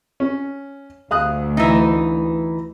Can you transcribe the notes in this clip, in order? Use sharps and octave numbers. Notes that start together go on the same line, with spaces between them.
C#4
D2 F5 D#6 F#6
E3 D#4